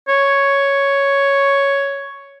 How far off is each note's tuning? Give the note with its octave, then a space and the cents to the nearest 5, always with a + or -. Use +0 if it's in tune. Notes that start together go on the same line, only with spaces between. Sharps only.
C#5 +5